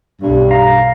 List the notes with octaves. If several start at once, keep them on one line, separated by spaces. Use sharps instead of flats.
B1 G2
F5 A#5